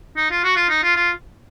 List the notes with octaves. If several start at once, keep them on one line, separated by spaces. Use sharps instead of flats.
D#4
F4
F#4
F4
D#4
F4
F4